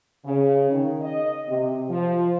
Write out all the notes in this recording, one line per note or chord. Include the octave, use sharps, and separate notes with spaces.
C#3
D#3
D#5
C3
F3